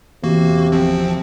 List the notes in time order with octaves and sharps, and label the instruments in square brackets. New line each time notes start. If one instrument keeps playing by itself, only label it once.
[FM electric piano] E2 [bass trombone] C3 [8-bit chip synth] A#3 F#4
[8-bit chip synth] G1 F3 C4